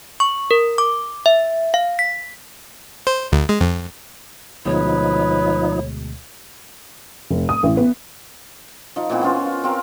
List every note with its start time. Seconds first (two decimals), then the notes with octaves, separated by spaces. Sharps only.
0.20 C#6
0.51 A#4
0.78 D6
1.26 E5
1.74 F5
1.99 B6
3.07 C5
3.32 D2
3.49 G#3
3.61 F2
4.65 D2 B2 F3 G#3 D#4 B4 C#5
7.31 F1
7.49 D#6
7.63 A1
7.77 B3
8.96 F3 D#4
9.10 A#2 E3 B3 C4
9.21 B3 C#4 F4 C5
9.45 F4
9.64 C4 F4 A#4 C5